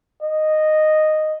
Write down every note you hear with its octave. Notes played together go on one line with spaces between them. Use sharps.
D#5